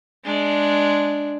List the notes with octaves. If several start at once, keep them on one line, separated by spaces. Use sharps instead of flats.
G#3 D4